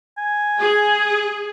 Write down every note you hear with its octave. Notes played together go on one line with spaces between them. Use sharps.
G#5
G#4